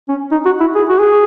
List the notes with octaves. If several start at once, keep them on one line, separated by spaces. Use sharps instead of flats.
C#4
D#4
F#4
E4
G#4
F#4
G#4